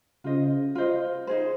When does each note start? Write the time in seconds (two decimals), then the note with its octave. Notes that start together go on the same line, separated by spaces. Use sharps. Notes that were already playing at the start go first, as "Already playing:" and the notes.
0.24 C#3 F4 C5 D#5
0.75 F4 C5 D#5
1.27 D#4 G#4 C5